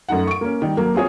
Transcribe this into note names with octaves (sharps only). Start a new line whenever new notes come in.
F#2 A3 D#4 F#5
C#6 D7
A#3 C#4
D#3 G3
F#3 A#3
C4 F4 G#4 C#5